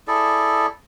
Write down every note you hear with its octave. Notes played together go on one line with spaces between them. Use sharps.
E4 G#4 A4 D5